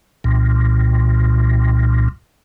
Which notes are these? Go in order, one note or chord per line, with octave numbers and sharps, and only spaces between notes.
C2 A#2